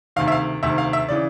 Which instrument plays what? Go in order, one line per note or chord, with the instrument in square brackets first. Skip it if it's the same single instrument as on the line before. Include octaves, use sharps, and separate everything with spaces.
[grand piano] D2 C3 D#3 F5
E5
F5
D2 C3 D#3 E5
F5
E5
C#3 E3 D5